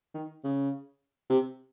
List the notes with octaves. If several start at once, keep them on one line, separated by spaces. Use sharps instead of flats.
D#3
C#3
C3